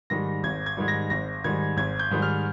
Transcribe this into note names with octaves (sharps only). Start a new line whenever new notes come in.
G#2 D#3 G3 A#6
G#1 G#6
G#6
G#2 D#3 G3
A#6
G#1 A#6
G#2 D#3 G3 G#6
G#1 G#6
G6
G#2 D#3 G3
F6